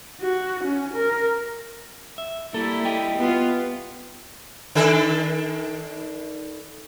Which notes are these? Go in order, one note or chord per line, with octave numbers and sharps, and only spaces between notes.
F#4
C#4
A#4
E5
G3 A#3 E4 A4
G4 D#5 G5
B3 F4
D#3 D4 A4